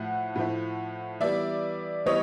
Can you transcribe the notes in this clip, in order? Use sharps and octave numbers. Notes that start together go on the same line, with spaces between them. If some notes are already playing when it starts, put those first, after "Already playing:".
Already playing: A2 F3 A3 F#5
A2 F3 A3
E3 G3 B3 D5 E5
E3 G3 B3 C#5 D#5